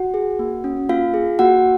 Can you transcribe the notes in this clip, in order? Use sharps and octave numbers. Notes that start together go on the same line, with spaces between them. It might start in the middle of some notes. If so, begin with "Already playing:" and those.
Already playing: F#4 F#5
G#4
A#3
C#4
A#3 F4 F5
G#4
A#3 F#4 F#5